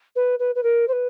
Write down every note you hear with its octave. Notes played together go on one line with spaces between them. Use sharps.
B4
B4
B4
A#4
C5
B4